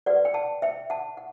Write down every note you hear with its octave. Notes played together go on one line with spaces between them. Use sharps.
F#4 B4 D5 F#5
G5
F#5 A5
E5 G5
F#5 A5
F#5